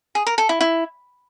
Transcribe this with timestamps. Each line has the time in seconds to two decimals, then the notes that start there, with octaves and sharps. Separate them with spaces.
0.15 G#4
0.26 A#4
0.38 A4
0.49 E4
0.61 E4